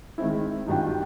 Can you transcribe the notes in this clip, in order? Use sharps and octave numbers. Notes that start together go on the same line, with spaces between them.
D#3 G#3 C4 E4
F#2 D#3 G3 D4 F4 G5